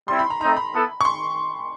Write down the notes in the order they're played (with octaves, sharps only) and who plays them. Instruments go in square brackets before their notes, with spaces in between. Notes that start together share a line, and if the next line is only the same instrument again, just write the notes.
[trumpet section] G3 C4 E4 [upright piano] C6
[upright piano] B5
A#5
[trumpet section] A3 C4 D#4 [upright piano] A#5
[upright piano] B5
[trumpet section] B3 E4 A4
[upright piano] C#6
C6